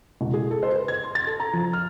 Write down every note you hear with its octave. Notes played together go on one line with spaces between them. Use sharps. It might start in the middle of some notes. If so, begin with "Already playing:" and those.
E1
G#4
A4
C5
B4
G#6
C6
A6
A4
A#5
F3
F6